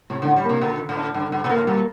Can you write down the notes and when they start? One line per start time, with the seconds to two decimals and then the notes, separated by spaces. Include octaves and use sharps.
0.10 A2 C3
0.22 D3
0.27 A2
0.36 G3
0.44 A#3
0.49 C3
0.61 A#2 D3
0.80 D3
0.89 A2
0.97 D4
1.14 G2 D3
1.32 G2 D3
1.44 A#2
1.50 A2 A#3
1.67 A#2 G3